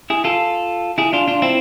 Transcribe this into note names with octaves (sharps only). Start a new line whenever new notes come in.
E4 G#4
F4 A4
E4 G#4
D4 F4
D4 F4
C4 E4